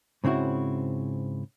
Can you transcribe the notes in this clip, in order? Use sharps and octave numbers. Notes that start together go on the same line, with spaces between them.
G#2 C#3 C4 E4 F#4